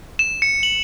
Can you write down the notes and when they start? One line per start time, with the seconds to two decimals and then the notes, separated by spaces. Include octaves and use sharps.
0.19 E7
0.42 C#7
0.63 F#7